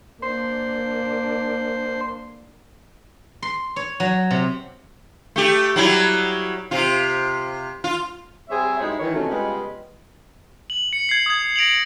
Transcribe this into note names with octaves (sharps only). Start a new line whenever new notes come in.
A#3 D4 C5
C6
C#5
F#3
C3
A3 G4
F#3 G3 E4
C3 F4
F4
G3 C4 G#4 C5 C#5 E5
G2 G#3 D#4 E4 F#4 C#5
D#3 E3 C#5
C3 A3 C#4 D#4 F4 F#4
C#3 G3 G#3 B3 F4 B4
F#7
C#7
G#6 C7
D#6 G#6
A#6 D7 F7 F#7